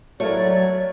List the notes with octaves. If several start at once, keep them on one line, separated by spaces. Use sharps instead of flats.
F#3 A3 E4 A#4 C#5 D5